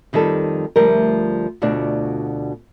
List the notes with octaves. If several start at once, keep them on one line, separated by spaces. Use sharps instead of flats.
F2 D#3 F3 G3 A4
D2 F3 G3 A#4
D2 B2 D4 F4 D5